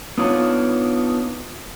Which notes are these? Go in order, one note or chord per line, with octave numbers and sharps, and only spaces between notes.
B3 D4 D#4 F4 C#5